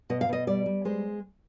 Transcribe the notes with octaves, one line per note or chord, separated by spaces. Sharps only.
B2 D#5
F5
B2 D#5
G3 D5
G3
G#3 C5